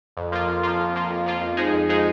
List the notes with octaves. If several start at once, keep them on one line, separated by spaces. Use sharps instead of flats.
F2
F3 A#3 F4
F2
F3 A#3 F4
F2
F3 A#3 F4
F2
F3 A#3 F4
F2
F3 G#3 D#4 G#4
F2
F3 G#3 D#4 G#4